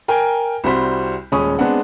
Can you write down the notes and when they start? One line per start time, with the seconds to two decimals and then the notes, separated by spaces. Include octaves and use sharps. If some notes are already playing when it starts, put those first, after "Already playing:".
0.08 A#4 G5 G#5 A#5 G#6
0.64 C2 G3 F#4 C5 B5 B6
1.32 D#1 G#3 C#4 B5 C#6 D#6
1.59 G#3 B3 C4 D4 F#5